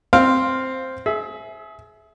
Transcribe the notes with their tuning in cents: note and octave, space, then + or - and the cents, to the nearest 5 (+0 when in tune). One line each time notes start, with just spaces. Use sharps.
C4 +0 F5 +0
G#4 +30 E5 -5